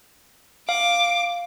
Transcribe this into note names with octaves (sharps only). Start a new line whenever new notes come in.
F5 D6